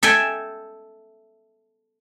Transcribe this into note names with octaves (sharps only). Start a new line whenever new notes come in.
A4 E5 G5 G#5